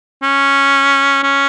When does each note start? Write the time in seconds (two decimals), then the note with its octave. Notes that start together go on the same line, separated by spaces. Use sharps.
0.23 C#4
1.23 C#4